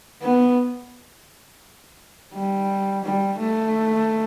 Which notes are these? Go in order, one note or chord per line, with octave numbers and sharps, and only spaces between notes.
B3
G3
G3
A3